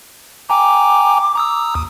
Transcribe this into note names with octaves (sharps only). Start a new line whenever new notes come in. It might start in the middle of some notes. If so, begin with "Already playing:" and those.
G5 G#5 A#5 D6
A#5 D#6 E6
D#2